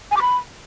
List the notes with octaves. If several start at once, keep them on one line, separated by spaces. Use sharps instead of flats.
G#5
D6
B5